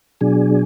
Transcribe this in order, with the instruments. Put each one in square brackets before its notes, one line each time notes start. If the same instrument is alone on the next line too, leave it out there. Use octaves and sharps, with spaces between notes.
[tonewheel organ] B2 F#3 D4 G#4